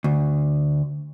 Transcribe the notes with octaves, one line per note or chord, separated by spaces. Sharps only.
D2